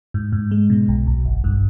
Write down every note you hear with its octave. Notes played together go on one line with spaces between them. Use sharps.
G#2
G#2
G#3
B2
B1
B1
G1
G2